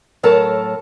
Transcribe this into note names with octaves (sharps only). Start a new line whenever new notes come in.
A2 F#3 A4 A#4 A5